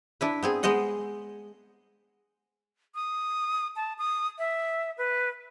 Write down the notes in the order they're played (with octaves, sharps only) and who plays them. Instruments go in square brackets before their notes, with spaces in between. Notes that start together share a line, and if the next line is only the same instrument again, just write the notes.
[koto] D4 E4 B4
B3 C4 G#4
G#3 B3 C5 D#5 F#5
[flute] D#6
A5
D#6
E5
B4